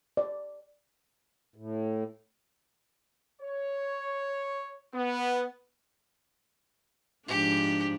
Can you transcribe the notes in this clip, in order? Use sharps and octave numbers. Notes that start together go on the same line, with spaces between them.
D5
A2
C#5
B3
G#2 F3 D4 G4